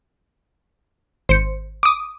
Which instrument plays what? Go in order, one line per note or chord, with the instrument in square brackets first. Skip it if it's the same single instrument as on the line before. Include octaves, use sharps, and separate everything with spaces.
[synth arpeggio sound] G#1 C#7 [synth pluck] C5
[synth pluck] D6 D#6